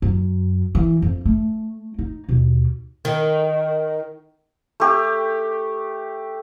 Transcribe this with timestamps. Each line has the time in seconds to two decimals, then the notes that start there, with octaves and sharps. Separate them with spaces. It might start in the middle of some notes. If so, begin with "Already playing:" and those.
0.02 F#2
0.75 E3
1.02 F2
1.26 A3
1.99 D#4
2.29 D#2 B2
3.05 D#3
4.80 A3 G4